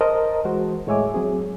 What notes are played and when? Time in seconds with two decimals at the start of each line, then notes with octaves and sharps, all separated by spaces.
0.01 A#4 C5 D#5 A5 A#5
0.45 E3 G#3 F#4 C5
0.87 A2 G#3 C#5 E5 G#5 D6
1.14 F#3 C4 G#4